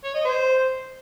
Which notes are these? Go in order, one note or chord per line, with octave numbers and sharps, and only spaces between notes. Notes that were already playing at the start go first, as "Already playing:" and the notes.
C#5
D#5
C5